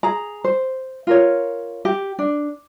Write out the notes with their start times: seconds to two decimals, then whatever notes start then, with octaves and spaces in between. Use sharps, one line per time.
0.03 G#4 A#5
0.44 C5
1.07 F4 A#4 C#5
1.85 G4
2.19 D4